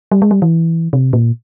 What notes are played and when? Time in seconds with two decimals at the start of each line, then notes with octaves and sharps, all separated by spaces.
0.12 G3
0.22 G#3
0.31 G3
0.42 E3
0.93 C3
1.13 A#2